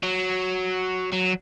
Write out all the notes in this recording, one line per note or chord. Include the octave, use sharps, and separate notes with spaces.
F#3
F#3